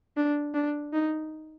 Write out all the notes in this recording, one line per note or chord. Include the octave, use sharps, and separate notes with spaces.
D4
D4
D#4